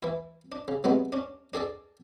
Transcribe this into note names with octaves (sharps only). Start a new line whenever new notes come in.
E3 E4
D4
C#3
C3 F#3 G#3 B3
C#4 D4
D4 G#4 A4 D5